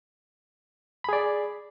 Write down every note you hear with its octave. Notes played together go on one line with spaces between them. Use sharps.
G#4 D5 B5